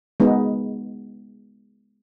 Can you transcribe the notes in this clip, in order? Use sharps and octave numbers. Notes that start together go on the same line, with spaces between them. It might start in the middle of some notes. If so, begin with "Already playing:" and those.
G#3 B3 D#4